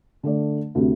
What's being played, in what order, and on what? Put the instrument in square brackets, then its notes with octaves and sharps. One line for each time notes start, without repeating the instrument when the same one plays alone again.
[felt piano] D3 A3 D5
D2 C3